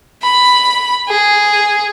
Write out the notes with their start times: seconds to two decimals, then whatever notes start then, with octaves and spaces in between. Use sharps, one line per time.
0.22 B5
1.09 G#4